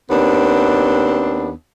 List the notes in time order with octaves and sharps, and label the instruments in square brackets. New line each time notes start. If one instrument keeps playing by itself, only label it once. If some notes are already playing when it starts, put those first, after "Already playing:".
[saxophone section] D#2 B3 C4 D4